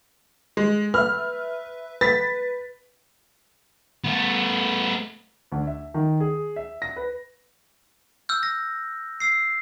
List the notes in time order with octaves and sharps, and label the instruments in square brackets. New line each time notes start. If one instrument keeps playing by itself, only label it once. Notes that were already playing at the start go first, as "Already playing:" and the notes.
[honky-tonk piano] G#3
[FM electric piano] B4 E5 [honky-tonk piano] F6
[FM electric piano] B4 [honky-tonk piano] A6 B6
[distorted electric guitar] A3 B3
[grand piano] D2
E5
D#3
G#4
E5
A#6
B4
[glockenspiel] E6 F6 G6
A#6
E6 C7